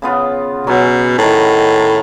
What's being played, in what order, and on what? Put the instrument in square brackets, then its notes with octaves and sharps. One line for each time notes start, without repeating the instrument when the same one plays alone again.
[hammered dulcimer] C#3 B3 F4
[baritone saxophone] B2 [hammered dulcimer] F#3 C#4 G#5
[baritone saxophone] A2 [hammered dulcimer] D#3 B4